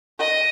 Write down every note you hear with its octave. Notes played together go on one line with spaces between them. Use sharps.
D#5